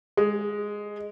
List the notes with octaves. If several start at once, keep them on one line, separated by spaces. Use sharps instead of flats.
G#3